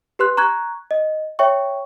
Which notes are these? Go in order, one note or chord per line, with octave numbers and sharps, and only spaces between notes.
G4 B4 C6 F#6
A#5 C#6 F#6 G#6
D#5
C#5 E5 G5 C#6